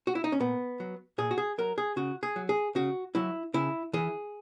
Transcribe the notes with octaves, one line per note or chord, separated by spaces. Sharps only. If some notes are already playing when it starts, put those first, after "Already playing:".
F#4
E4
D#4
C#4
A#2 B3
F#3
A#2 G#4
F#4
G#4
F#3 A#4
G#4
C#3 F#4
G#4
F#3
G#4
C#3 F#4
F#3 E4
C#3 E4
E3 G#4